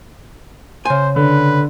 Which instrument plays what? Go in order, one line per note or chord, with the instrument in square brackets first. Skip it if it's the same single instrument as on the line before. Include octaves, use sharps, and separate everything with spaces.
[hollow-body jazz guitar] C#3 G#5 [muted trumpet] C5
[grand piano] D3 [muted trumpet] B4